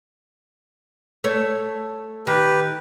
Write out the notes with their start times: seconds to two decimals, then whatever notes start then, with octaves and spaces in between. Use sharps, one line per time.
1.24 A3 C#5
2.27 D#3 G4 B4